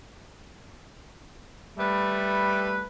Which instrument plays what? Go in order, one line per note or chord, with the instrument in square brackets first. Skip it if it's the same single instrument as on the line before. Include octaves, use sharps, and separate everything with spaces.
[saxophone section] G3 A3 B4